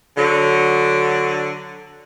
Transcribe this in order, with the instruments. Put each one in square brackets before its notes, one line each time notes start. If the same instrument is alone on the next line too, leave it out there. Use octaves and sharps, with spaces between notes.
[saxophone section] D3 F#3